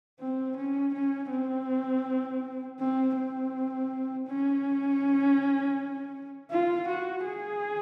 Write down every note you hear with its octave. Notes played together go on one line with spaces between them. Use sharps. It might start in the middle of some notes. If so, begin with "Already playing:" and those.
C4
C#4
C#4
C4
C4
C4
C#4
F4
F#4
G#4